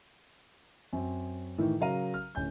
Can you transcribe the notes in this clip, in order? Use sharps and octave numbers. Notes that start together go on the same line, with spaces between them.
F#2 C4
A2 D#3 E3
C#3 F#3 A#4 F5 A#5 D#7
F6
D1 C#4 G#5 G6